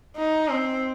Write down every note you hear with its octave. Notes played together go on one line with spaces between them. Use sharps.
D#4
C4